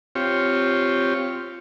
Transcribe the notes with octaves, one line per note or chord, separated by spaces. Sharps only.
C4 F4 G4 C#5